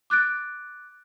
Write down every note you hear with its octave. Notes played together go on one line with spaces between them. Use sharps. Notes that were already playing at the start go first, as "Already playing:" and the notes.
D6 F#6 A6 D7